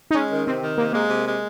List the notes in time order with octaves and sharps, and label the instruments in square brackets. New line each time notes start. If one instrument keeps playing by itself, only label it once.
[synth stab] D#4
[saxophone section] G#3 [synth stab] C#4
[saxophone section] D#3
[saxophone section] C3 [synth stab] C4
[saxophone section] D#3
[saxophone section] C3 [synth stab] A#3
[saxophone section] G#3 [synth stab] A#3
[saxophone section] C3
G#3